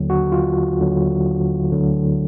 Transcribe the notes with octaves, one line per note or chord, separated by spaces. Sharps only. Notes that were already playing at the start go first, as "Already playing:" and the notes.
Already playing: D#2 D3 F#3
F#4
F4
D#2 D3 F#3
D2 D3 F#3